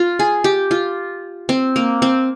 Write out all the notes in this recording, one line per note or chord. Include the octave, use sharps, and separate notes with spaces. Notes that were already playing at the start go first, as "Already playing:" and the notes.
Already playing: F4
G#4
G4
F4
C4
A#3
C4